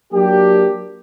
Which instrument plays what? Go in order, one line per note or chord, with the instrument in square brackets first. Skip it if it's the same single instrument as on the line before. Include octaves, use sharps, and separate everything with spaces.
[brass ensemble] F#3 A#3 D4 G4